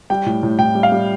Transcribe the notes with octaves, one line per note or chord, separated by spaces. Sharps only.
G3 G5
A2
A2
A2 G5
G3
F5
G3